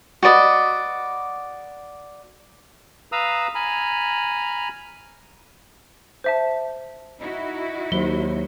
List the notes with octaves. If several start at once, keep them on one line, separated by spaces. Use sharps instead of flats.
F#4 B4 D5 D#5
B4 F5 A#5 D#6 E6
G#5 A#5 B5 F6
C5 E5 A5
D#4 E4 F#4
D#2 F#3 C5 G7